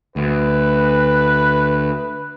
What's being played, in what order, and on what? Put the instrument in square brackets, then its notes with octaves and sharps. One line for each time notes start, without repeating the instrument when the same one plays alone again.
[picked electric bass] D2 [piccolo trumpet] B4